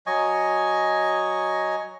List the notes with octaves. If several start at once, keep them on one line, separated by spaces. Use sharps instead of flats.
F#3 D#5 G#5 C#6